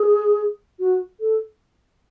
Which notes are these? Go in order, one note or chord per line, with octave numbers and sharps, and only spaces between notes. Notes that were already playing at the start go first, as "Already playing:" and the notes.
Already playing: G#4
F#4
A4